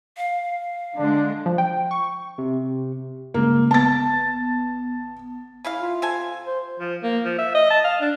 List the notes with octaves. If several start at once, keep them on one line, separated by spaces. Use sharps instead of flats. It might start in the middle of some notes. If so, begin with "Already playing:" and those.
F5
D3 G#3 D4
F3
G5
C#6
C3
G2 C#3 G#3 A#3
G1 B3 A5 A6
C#3 E4 F5
F4
C3 A4 G#5
C5
F3
A#3
F3
E5
D#5
A5
F5
D4